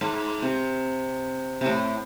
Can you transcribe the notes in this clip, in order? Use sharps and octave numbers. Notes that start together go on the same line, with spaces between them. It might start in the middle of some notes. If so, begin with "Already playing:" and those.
G#2
C3
C3
A2